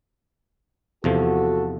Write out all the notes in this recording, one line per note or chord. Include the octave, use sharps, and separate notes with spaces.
E2 C3 F3 F#4 A4